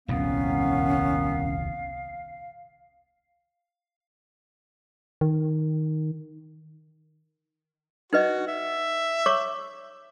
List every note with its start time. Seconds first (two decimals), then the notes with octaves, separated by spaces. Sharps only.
0.08 D#1 C2 F2 D#3 B3 C#4 F5
5.21 D#3
8.13 D#4 F#4 B4 D#5
8.48 E5
9.26 C#5 C#6 D6